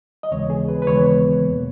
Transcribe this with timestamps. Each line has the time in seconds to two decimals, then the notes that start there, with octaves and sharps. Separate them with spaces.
0.23 D#5
0.31 D#2 C#3 E3 G#3 B3 C#5
0.50 G#4
0.69 B4
0.82 B4
0.87 D#2 C#3 E3 G#3 B3 C#5
1.42 E2 B2 A#3